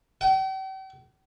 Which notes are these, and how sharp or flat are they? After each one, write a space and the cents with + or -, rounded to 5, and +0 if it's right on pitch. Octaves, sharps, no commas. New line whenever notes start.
G5 -40